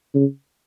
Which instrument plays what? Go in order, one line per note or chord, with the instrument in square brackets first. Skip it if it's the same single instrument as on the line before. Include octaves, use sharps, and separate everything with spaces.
[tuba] C#3